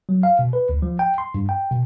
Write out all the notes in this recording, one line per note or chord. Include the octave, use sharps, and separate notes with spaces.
F#3
F5
B2
B4
D2
F3
G5
C6
G2
G5
B2